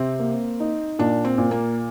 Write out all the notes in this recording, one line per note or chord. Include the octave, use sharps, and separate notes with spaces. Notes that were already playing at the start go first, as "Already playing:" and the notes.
Already playing: C3 C4
A#3
D#4
A#2 D4
C4
A#2
A#3